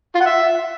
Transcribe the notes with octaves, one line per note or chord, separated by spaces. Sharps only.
F4
F#5
E5